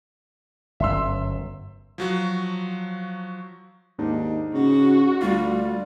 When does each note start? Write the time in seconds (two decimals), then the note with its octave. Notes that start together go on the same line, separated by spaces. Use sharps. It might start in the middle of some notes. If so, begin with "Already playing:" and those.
0.80 G1 F#2 E5 C6 E6
1.98 F3 F#3 F#4
3.98 D#2 G#2 D4 D#4
4.54 C#3 F#4
5.22 D2 G3 A3 F4